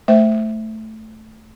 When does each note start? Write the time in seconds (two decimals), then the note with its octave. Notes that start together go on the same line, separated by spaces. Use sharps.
0.08 A3 C5 E5